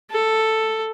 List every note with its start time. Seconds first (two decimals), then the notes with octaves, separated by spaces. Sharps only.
0.11 A4